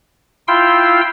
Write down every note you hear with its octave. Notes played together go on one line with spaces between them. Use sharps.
E4 F4 F5 G5 C6 E6